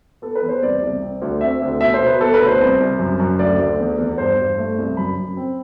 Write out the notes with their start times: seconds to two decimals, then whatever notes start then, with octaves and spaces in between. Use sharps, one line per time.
0.22 B3 A4
0.35 B4
0.42 E2
0.49 C5
0.62 C2 D5
0.82 C2
1.02 C4
1.22 D2
1.41 C4 E5
1.62 D2
1.81 B2 E5
1.94 C5
2.01 B2
2.07 B4
2.21 B3 A4
2.34 B4
2.40 D2
2.47 C5
2.60 C2
2.80 C2
2.99 F#2
3.20 F#2
3.39 D2 D5
3.59 D2
3.79 E2
3.98 E2
4.18 G2 C5
4.39 G2
4.57 A3
4.78 C2
4.97 F#2 B5
5.17 F#2
5.37 C4